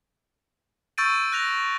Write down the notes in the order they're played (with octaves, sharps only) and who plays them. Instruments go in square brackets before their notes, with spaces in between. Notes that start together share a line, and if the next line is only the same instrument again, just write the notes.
[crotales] C#6 E6 G6 A6 D7 D#7
F#6 A#6 F7